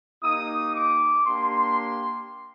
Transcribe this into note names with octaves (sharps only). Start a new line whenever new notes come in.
A#3 D#4 G4 D#6
D6
A#3 D4 G4 C6